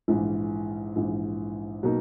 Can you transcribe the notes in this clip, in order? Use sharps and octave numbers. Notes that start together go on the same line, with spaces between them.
A#1 G#2 E3
A#1 G#2 E3
B2 F#3 A#3 D#4